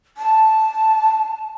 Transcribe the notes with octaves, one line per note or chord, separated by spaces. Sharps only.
A5